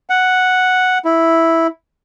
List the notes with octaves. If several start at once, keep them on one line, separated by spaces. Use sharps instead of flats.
F#5
E4